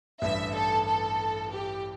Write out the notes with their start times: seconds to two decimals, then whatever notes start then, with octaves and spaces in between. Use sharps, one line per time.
0.22 A1 G2 E3 E5
0.54 A4
0.86 A4
1.50 G4